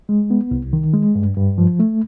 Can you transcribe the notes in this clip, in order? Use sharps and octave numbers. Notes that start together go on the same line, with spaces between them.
G#3
B3
C2
D#3
G#3
G2
G2
F3
A3